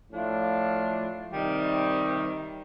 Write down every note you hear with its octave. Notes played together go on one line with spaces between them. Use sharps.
A2 F3 A3 D4 F4
C3 D#3 G3